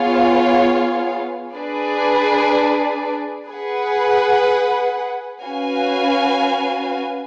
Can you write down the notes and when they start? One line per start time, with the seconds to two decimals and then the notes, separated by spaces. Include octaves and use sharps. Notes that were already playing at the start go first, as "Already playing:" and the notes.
Already playing: B3 F4 G#4 C#5 F5
1.55 D4 G#4 B4 D5
3.49 G#4 B4 F#5
5.44 C#4 F#4 B4 F5 G#5